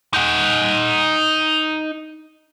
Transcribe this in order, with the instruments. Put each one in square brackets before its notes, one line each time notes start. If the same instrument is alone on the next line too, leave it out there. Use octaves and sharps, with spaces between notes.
[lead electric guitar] D#4 F#5